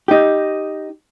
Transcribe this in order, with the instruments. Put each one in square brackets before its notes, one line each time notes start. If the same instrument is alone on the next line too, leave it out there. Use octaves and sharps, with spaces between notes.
[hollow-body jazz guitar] D#4 G4